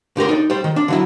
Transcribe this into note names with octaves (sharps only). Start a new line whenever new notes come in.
D3 G4 A#4 C6
D#4 D5
G3 C5
D#3
D4
D3 F#3 E4